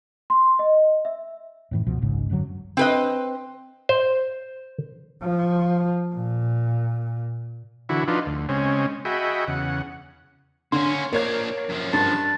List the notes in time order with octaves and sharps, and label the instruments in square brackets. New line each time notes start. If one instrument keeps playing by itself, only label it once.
[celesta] C6
D#5
E5
[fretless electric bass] F#2 A2 E3
C#2 B2 F3
G#1 C#2 G#2 C#3
D1 F#2 D3 F#3
[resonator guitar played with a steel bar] C4 B4 D#5
[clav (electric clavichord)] C5
[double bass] F3
A#2
[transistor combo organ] D3 E3 E4 F#4
F3 D4 D#4 F4 B4
D2
C#3 G#3 C4 C#4
F#4 G#4 D#5 E5 G5 B5
E2 C#3 F#5
[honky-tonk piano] D3 [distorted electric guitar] A#3 C#4 [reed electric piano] C6
[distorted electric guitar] A#2 C5 [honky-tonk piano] A#3 C#5 G#6 [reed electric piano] A#4
[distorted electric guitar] F#2 F3
[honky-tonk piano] G2 [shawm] A5